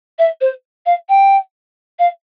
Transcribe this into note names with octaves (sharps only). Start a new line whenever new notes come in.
E5
C5
F5
G5
F5